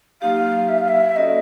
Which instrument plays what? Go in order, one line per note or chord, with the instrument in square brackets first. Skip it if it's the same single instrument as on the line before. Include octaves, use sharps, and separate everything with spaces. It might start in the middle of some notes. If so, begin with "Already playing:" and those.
[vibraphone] F#3 A#3 D#4 G4 [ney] F5
[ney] E5
F5
E5
[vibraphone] A#3 C#4 F#4 A4 D5 [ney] D#5